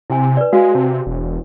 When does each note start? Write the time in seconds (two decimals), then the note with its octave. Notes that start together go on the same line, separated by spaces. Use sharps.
0.10 C3 E4 G#5
0.37 B4 D5
0.53 G#3 F#4 F5 G#5
0.75 C3 A5
1.07 E1